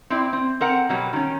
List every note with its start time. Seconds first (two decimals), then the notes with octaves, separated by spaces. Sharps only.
0.10 C4 E4 D5
0.33 C4
0.61 C4 A#4 F#5
0.89 B2 F#3 G3
1.13 D#3 C#4